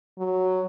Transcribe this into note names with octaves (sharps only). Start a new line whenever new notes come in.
F#3